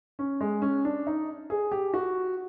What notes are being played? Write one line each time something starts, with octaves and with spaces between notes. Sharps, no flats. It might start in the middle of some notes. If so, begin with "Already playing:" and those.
C#4
G#3
C#4
D4
D#4
G#4
G4
F#4